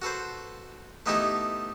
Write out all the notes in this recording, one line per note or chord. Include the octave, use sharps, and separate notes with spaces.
F#4 A4 B4 C5
A3 B3 D#4 E4 G4 A4